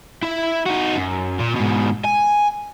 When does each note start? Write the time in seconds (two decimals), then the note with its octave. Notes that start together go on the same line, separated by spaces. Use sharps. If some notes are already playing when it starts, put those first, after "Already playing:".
0.23 E4 E5
0.66 D#4 F#4
0.96 F#2
1.39 A#2
1.55 G#2 B2
2.05 G#5